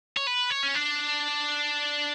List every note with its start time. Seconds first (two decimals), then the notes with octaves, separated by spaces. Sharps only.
0.17 C#5
0.27 B4
0.51 C#5
0.63 C#4
0.75 D4